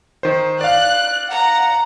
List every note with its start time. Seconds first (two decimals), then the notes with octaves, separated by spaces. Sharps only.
0.23 D#3 C5
0.61 D5 F5 F#6
1.30 F#5 A#5